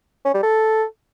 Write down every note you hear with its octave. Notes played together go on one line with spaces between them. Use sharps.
C#4
G3
A4